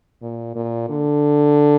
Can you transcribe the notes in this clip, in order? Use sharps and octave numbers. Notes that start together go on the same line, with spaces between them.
A#2
A#2
D3